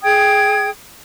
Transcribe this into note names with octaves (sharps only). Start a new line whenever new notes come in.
G#4 G5 D#6 G#6